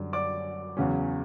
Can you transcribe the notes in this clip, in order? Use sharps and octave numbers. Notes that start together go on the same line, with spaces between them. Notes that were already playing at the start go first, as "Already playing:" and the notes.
Already playing: F#2 D3 G3
D5 D6
E2 C#3 F#3 C#4